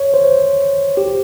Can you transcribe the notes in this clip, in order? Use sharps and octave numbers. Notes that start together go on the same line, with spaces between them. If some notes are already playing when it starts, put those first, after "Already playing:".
Already playing: C#5
C5
G4